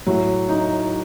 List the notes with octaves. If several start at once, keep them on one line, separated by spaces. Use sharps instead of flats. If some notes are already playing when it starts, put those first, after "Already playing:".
A2 F#3
D#4